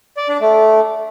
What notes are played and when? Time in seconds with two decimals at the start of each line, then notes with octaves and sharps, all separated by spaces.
0.17 D5
0.29 D4
0.41 A3